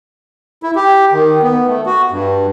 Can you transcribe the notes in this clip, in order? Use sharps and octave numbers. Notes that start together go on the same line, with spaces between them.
E4
G4
D#3
B3
A3
F#4
G2